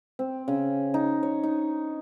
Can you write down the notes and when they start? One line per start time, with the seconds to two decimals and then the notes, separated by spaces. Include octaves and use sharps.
0.19 C4
0.48 C#3
0.94 D#4
1.23 C#5
1.43 D#4